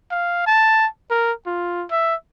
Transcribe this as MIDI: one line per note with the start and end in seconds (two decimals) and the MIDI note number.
0.11 0.44 77
0.47 0.87 81
1.10 1.32 70
1.47 1.86 65
1.91 2.15 76